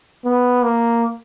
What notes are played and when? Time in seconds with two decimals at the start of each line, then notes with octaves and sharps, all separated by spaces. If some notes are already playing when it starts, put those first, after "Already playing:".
0.25 B3
0.64 A#3